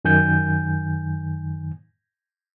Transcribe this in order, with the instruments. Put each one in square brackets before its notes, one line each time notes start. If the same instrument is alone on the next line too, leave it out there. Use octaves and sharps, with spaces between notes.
[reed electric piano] F#2 D#3 G#5 G6